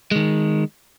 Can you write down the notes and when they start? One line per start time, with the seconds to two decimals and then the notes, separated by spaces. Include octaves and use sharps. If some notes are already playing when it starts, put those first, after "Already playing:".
0.11 D#3 G#3